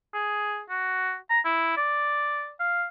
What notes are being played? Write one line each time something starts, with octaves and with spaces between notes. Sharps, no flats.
G#4
F#4
A#5
E4
D5
F5